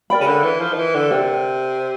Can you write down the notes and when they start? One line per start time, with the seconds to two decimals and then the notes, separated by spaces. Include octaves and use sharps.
0.10 A#4 D5 G5 B5
0.20 C#3
0.27 D3
0.44 E3
0.60 F3
0.73 D#3
0.78 E3
0.95 D3
1.11 C3 A#4 D5 G5